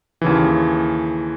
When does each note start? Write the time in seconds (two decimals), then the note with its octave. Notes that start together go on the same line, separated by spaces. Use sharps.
0.21 D#2 C#3 E3